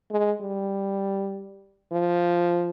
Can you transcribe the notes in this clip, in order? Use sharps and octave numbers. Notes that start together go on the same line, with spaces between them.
G#3
G3
F3